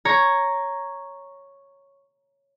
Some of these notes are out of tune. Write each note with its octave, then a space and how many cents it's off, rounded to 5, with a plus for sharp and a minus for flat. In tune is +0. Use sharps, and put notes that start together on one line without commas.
C#5 +0 A#5 +0